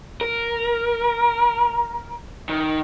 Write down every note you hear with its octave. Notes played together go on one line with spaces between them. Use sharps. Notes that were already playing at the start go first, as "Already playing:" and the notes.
A#4
D#3